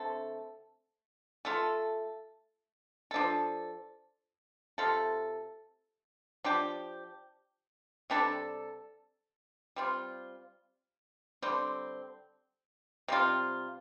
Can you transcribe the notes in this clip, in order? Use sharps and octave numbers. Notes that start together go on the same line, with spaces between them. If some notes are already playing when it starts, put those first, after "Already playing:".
Already playing: D3 A3 C4 A4
A3 F4 A4
F3 D4 A4
C3 A3 F4 A4
F3 D4 G4
C3 G3 D4 A4
G3 C4 F4
D3 G3 C4
C3 G3 C4 F4